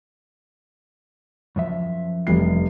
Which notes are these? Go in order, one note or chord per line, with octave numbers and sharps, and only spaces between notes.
F#2 F3 E5
F1 G3 C7